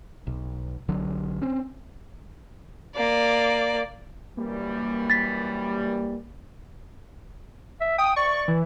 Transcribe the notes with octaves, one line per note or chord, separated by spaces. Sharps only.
B1
B1 D3 F#3
C4 C#4
A#3 D5
F#2 E3 G3 A#3
A6 B6
E5
G5 D#6
D5 C#6
E3